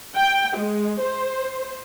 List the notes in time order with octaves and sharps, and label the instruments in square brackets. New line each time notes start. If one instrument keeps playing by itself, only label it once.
[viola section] G5
G#3
C5